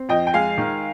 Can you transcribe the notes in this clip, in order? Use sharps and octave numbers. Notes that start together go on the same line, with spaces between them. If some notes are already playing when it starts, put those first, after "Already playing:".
Already playing: C4
F2 D#5 G5
G5
G#3 F5 G#5
D#3